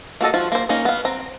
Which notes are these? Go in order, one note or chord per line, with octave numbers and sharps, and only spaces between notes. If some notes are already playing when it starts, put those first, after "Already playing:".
A#3 F#4 A4 D#5
F3 F4 F#4
A#3 C5
A#3 C#4 D#4
B3 F5
C4 A#5